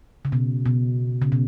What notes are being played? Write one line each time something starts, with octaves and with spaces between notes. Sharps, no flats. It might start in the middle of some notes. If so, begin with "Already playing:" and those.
C#3
B2
B2
C#3
B2